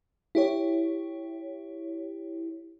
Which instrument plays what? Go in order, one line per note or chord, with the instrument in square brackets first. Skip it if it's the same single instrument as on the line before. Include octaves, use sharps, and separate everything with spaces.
[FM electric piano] E4 G4 C#5